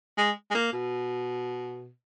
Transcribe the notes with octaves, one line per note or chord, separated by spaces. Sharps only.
G#3
G#3
A#3
B2